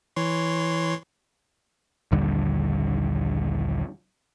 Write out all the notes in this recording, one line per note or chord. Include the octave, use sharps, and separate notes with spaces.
E3 C#5 C6
A#1 D#2 D3 G3